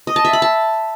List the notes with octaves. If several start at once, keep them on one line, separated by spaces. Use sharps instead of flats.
D#5
A5
E5
B5
A5